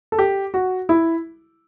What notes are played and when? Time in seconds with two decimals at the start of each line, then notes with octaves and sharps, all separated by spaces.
0.12 A4
0.19 G4
0.54 F#4
0.89 E4